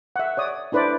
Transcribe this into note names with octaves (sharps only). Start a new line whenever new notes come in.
E5 F#5
C#5 D5 D#6
D4 E4 B4 C5 D5